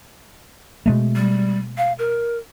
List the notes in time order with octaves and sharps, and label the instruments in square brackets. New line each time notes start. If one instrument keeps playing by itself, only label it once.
[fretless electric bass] B2 G#3 A3
[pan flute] G3
F5
A#4